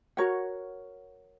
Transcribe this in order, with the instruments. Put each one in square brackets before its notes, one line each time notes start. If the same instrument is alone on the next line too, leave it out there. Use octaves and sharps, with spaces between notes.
[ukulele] F#4 A#4 C#5 F#5